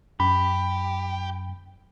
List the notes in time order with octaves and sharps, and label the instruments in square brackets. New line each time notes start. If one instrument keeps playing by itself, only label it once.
[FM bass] F#2 [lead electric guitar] G4 [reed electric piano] B5